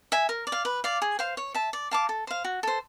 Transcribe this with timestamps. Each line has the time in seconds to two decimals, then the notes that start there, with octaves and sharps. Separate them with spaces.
0.12 E5 G#5
0.29 A#4
0.47 D5
0.52 F5
0.65 B4
0.84 D5 F5
1.02 G#4
1.19 C5 F5
1.37 C#5
1.54 E5 A5
1.73 D5
1.91 F5 A5 D6
2.09 A4
2.27 C5 F5
2.44 F#4
2.63 A4 C5